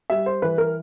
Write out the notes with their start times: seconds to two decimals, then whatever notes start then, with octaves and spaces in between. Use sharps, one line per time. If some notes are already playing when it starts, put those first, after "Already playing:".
0.10 G3 E5
0.26 C5
0.42 E3 B4
0.58 A#4